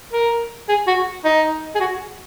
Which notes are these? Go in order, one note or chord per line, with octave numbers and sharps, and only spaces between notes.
A#4
G#4
F#4
D#4
G#4
F#4